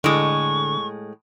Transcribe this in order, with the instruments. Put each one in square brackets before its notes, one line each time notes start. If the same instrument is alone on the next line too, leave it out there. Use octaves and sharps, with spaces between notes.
[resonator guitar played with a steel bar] A2 G#3 [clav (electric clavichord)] D3 D#5 [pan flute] C#6